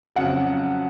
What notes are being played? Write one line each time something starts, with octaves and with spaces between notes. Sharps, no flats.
F2 C#3 F#3 F#5